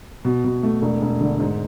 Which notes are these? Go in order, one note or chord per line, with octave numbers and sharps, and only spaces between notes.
B2
B2
A3
E1
E1
D3
G#2